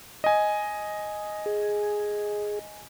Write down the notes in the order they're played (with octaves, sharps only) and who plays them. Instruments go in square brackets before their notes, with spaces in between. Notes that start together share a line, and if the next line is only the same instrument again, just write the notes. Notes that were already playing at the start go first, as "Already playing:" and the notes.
[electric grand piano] D#5 G#5
[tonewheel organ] G#4